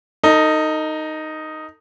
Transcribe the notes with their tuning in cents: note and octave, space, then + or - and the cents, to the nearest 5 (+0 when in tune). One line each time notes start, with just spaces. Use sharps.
D#4 +0 A4 +40